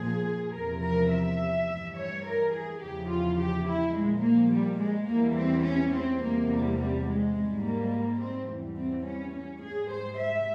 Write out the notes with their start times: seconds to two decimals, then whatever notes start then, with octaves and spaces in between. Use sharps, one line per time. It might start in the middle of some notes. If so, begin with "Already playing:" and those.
Already playing: A#2 F3 G#4
0.54 E2 C3 F3 A#4
0.83 A#4
1.11 E5
1.68 G2 E3 G3
1.97 C#5
2.25 A#4
2.53 G#4
2.81 E2 C#3 F3 G4
3.10 F4
3.39 G4
3.66 E4
3.94 A#2 F3 G#3
4.23 A#3
4.51 G3
4.79 G#3
5.08 E2 E3 G3 A#3
5.37 C4
5.65 C#4
5.93 C4
6.21 E2 C3 G3 A#3
6.50 G3
6.79 G3
7.07 G#3
7.35 G#2 G3
7.64 A#3
8.19 C4
8.48 E2 E3 G3
8.77 C4
9.05 C#4
9.34 C#4
9.62 G#2 G3 G#4
9.90 C5
10.19 E5